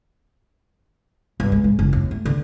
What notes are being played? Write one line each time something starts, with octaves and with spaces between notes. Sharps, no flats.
G2
G#3
G#2
F#1
D#2
A3
D3